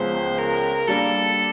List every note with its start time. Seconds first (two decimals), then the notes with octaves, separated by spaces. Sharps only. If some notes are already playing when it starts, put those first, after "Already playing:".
Already playing: C#2 C#3 F3 G#3 B3 C5
0.38 A#4
0.88 G3 A#3 D4 A4